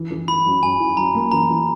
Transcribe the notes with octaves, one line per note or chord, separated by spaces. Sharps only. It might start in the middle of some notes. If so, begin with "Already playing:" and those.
Already playing: E3
E3
E4 B5
F#2
F#2 G#5
E4
F#2 A#5
A#3
E3 A#5
E3